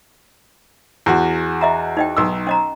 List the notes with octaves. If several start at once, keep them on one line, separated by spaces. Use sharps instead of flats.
E2 F#4
D#5 E5 A#5
D#4 D#5 G5
B1 E6
C#4 D#5 A#5